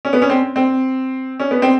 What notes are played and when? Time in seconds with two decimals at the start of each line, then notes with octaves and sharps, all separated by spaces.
0.05 C#4
0.13 B3
0.22 C#4
0.30 C4
0.56 C4
1.40 C#4
1.51 B3
1.62 C4